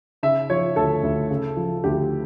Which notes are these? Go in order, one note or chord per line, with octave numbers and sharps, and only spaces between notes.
C#3 E5
F3 C#5
D2 A4
D2
C#3
F3
D2 G4